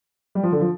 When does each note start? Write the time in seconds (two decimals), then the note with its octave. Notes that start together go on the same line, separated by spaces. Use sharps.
0.35 G3
0.43 F3
0.52 D3
0.61 F3